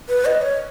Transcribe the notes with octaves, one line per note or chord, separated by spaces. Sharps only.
B4
D#5
C#5